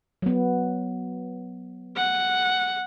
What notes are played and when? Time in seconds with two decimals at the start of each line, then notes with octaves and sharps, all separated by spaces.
0.22 F#3 B3
1.97 F#5